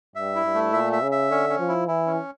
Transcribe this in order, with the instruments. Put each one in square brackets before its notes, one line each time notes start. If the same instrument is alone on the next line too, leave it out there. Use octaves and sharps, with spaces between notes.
[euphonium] G2 [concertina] E5
[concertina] E4
[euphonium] G2
[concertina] A3
[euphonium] A#2 [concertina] E5
[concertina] E5
[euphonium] C#3
[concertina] E5
[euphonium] D3 [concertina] C#4
[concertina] C#4
[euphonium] F3
[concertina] E4
[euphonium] E3 [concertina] E4
[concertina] C#4